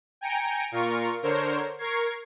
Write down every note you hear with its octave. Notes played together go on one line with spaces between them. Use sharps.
G5 G#5 A#5 C#7 D7
A#2 F4 A#4 C#6
D3 A#4 C5 C#5
A#4 C#6 G#6 C7